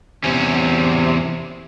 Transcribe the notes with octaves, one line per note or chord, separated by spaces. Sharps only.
E2 C3 C#4